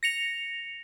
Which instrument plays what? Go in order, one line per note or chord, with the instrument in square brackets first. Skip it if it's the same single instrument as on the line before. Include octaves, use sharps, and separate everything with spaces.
[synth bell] A#6 C#7 F7